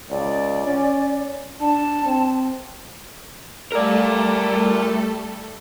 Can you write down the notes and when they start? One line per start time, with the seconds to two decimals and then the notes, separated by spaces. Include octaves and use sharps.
0.10 C#2 D5
0.67 C#4
1.61 D4 A5
2.05 C4
3.72 G3 A3 A4 A#4 D5